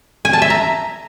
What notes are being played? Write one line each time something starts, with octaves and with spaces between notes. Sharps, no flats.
G#5
A5
E5
A#5